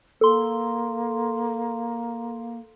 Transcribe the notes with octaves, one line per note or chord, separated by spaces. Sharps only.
A#3 A4 C6